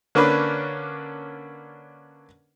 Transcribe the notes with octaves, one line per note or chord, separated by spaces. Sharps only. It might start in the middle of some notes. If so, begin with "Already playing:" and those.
D3 A#3 C#4 D4 B4